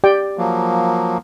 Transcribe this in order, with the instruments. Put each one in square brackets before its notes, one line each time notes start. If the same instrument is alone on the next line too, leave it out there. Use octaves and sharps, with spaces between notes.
[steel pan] G4 D5 G5
[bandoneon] F3 F#3 A#3